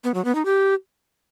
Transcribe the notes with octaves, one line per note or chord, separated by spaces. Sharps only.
B3
F#3
B3
D#4
G4